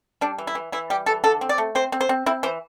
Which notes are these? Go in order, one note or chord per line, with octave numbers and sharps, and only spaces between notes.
G3 D4
E3
E4
E3
E3 E4
G3 G4
E3 A4
D3 A4
C4
D5
A3
C4 C5
C4
C5
C4
C4 E4
E3 C5